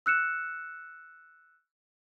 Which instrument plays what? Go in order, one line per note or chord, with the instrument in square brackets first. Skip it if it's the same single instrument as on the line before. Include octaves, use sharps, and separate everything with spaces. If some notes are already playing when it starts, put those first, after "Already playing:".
[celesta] E6 F#6 C#7 E7